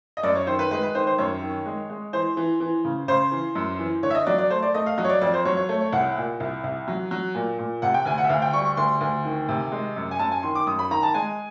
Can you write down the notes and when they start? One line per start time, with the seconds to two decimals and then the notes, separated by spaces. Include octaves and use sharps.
0.17 D#5
0.23 F#2 D5
0.35 C#5
0.47 D#3 C5
0.59 B4
0.71 G#3 B4
0.83 B4
0.95 D#3 C5
1.07 C5
1.18 F#2 C#5
1.42 D#3
1.66 G#3
1.90 G#3
2.13 E3 C5
2.37 E3
2.60 E3
2.85 C#3
3.08 C#3 C5
3.32 E3
3.55 F#2
3.79 E3
4.03 D3 C#5
4.11 E5
4.15 D#5
4.26 F#3 D5
4.38 D5
4.50 A3 C5
4.63 D5
4.74 A3 D#5
4.86 F5
4.98 F#3 D#5
5.04 C#5
5.09 D5
5.21 F2 D5
5.34 C5
5.45 F#3 C#5
5.57 C#5
5.69 A3 C#5
5.81 C#5
5.92 C2 F#5
6.16 A#2
6.40 C2
6.64 C2
6.88 F#3
7.11 F#3
7.35 A#2
7.59 A#2
7.82 C3 F#5
7.94 G5
8.06 D2 G#5
8.18 F#5
8.24 E5
8.30 D2 F5
8.42 G5
8.53 G3 C#6
8.65 C#6
8.77 D2 C6
9.01 D2
9.25 D#3
9.49 C3
9.72 G#3
9.96 F#2
10.11 G#5
10.19 F#2 A5
10.32 G#5
10.43 D#3 C6
10.55 D6
10.67 F#2 D#6
10.79 B5
10.91 D#3 A#5
11.03 A5
11.14 G#3 G#5